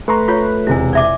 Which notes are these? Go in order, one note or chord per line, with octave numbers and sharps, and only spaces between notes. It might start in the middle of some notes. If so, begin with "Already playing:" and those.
A3 B4 A#5 C6 C#6
F4 C#5
E1 C3 G#3 E4 G#5
D5 E5 D6